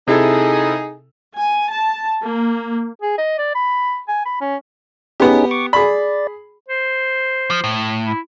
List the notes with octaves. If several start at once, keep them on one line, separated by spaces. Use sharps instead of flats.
C3 D#4 E4 G#4 A4
G#5
A5
A#3
G#4
D#5
D5
B5
G#5
B5
C#4
B3 C#4 D#4 G4 G#4
C#6 D6
G#4 D5 B5
C5
F3
A2
E4